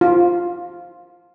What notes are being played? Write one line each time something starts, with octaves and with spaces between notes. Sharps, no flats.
F4